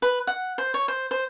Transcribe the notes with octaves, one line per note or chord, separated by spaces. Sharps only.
B4
F#5
C5
C#5
C5
C5